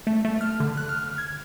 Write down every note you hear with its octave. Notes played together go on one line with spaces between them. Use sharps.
A3
A3
F6
D3
F#6
F6
G#6